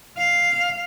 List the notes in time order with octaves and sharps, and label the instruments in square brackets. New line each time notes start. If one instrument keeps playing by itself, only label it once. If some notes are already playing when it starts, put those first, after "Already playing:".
[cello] F5